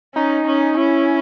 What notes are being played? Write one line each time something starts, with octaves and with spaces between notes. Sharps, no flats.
C#4 D#4
C#4
C#4 E4